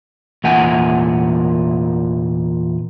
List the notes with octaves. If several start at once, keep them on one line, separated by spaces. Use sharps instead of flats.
E2 A#2 F#5 G#5